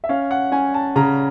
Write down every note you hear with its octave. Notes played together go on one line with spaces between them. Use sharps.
E5
C#4 F5
F#5
C#4 G#5
A5
C#3 A#5